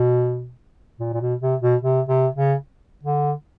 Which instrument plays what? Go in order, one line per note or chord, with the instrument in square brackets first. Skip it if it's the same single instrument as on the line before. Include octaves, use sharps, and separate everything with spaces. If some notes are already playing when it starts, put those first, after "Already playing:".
Already playing: [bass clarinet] B2
A#2
A#2
B2
C3
B2
C3
C3
C#3
D3